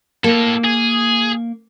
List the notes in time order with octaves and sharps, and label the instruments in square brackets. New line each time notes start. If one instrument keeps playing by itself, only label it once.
[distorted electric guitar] A2 A4 [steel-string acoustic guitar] A#3
[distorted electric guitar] G#4